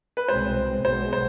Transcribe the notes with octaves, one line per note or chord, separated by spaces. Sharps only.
B4
C2 B2 G#3 C4 C5
B1 B2 G#3 B3 C5
C5